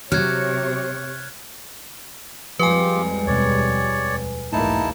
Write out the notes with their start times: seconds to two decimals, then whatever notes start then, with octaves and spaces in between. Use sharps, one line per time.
0.12 C3 F#3 C#5 F6 F#6 G#6
2.59 F2 F3 G3 G#3 F4 G4 B4 G#5
3.27 D#2 B2 C#5 D5
4.53 B1 E2 G#2 A3 A#3 D#4 E4 A5